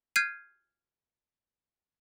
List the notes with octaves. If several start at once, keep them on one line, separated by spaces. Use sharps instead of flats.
F6 G6 G#6 C7 D#7